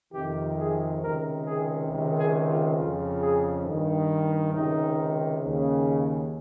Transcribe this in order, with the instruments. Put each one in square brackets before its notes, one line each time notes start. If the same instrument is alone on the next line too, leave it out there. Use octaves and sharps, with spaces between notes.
[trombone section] F2 C3 D#3 G4
G#4
C#2 C3 D#3 A#4
G#4
C#2 C3 D#3
G#4
F4
F2 C#3 F4
G#4
G2 D#3
C#2 C3 D#3 D#4
D#2 C#3